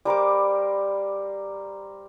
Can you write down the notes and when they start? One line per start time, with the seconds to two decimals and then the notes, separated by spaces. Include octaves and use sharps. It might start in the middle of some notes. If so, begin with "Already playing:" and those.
0.05 G3 A#4 C5 D6